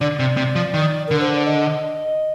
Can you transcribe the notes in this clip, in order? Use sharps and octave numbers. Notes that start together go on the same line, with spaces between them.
D3 D5
C3
C3
F3
D#3
D3 A#4
C5
D5
D#5